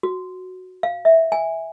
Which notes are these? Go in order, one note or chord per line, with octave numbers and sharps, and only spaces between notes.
F#4
F5
E5
G#5